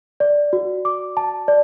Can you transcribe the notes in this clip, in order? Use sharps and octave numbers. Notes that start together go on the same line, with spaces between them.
D5
F#4
D6
A5
D5